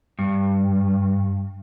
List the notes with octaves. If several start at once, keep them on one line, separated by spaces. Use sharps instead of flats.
G2